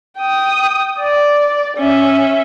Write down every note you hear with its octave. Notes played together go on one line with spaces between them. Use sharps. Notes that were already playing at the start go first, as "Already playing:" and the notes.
G5 D#6
D5
C#4 E5